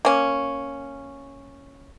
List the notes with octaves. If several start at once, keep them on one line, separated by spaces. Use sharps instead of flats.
A#3 C#4